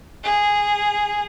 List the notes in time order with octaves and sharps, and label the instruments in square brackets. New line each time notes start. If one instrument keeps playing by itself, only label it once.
[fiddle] G#4